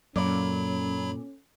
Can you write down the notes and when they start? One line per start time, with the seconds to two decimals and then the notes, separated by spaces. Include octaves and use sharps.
0.16 F#2 A#2 F#3 C#4 A4 D5 B5